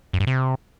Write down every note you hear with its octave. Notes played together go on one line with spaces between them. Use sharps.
F#2
G2
C3